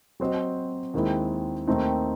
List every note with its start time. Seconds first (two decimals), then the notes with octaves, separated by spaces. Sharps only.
0.20 F#3 C4 F#4 C5 D#5
0.94 D#2 D#3 G#3 C4 E4
1.67 D#2 D#3 A3 C4 D#4